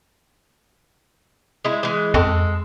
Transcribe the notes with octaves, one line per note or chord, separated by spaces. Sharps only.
G#3 E4
E3 G#3
F2 G#3 A4